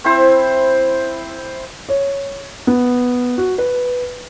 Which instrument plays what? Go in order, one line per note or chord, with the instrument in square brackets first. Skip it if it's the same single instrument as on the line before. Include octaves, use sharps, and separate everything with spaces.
[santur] C4 E4 C5
[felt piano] C#5
B3
F#4
B4